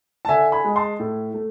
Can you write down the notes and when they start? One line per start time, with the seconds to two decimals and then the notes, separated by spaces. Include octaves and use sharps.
0.25 A5
0.29 D3 E5 G#5
0.52 G#5 B5
0.64 G#3
0.76 A5 C6
0.99 A2
1.34 A3